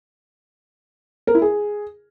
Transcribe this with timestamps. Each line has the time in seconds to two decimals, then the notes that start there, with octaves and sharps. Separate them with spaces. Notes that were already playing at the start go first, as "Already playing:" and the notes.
1.27 A#4
1.35 E4
1.42 G#4